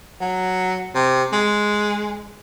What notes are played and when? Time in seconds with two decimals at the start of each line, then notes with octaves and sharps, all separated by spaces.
0.21 F#3
0.95 C3
1.33 G#3